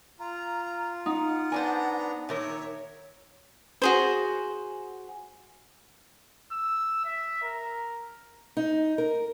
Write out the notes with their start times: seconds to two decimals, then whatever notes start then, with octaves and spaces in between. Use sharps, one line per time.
0.19 F4 A#5
1.06 D#4 F#5
1.52 B3 D4 C5 D5 G#5 A#5
2.29 A#2 D#3 A#4 C#5 E5
3.82 F#4 G#4 C5
6.52 E6
7.05 E5
7.42 A#4
8.57 D#4
8.98 A#4